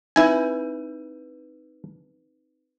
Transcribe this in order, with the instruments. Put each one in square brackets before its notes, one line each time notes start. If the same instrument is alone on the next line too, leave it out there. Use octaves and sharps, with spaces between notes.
[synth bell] C4 D#4 B4 [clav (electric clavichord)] E4 G#5